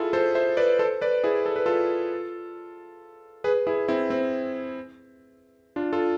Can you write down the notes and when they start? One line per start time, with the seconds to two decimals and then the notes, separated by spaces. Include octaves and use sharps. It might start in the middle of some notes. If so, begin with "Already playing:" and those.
Already playing: E4 F4 G#4 A4
0.13 A4 C5
0.35 C5 E5
0.57 B4 D5
0.79 A4 C5
1.01 B4 D5
1.24 E4 G#4
1.46 A4
1.56 B4
1.66 F4 A4
3.44 G#4 B4
3.67 E4 G#4
3.88 C4 E4
4.10 C4
5.76 D4 F4
5.93 F4 A4